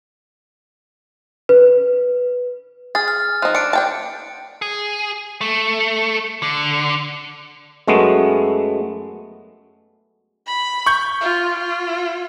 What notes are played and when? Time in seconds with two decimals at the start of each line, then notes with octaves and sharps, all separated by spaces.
1.49 B4
2.95 G#4 F6 A6
3.08 F6
3.42 F3 D#4 F#6
3.55 D4 C#7 D7
3.73 D4 G5 A5
4.62 G#4
5.41 A3
6.43 D3
7.87 F#2 G#3 A3 B3
10.47 B5
10.86 C#6 G6
11.21 F4
11.59 F4